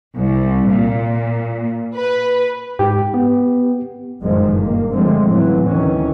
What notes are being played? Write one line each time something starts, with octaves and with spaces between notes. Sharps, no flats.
C2
A#2
B4
G#2 G4
B3
F#1 G2 A#2 D#3 F3 G#3
A#3
D3 F3 G#3 A3 C4
A2 C#3 E3 F#3
D2 A2 D#3 E3 C#4